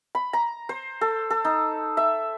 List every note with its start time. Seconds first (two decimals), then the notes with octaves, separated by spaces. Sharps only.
0.15 B5
0.33 A#5
0.69 C5
1.01 A4
1.30 A4
1.45 D#4
1.97 E5